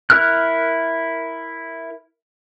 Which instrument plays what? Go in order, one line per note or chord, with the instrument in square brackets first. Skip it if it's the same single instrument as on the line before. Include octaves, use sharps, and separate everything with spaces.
[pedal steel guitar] E4 A#4 F6 F#6